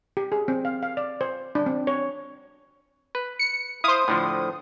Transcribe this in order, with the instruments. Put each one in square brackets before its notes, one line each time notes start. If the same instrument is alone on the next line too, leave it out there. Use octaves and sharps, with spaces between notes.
[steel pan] G4
G#4
C4
F5
F5
D5
C5
D4
C4
C#5
[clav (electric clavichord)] B4
[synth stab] C#7
[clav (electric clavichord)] E4 F5 [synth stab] C5 D#6
[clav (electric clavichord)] A2 D3 F3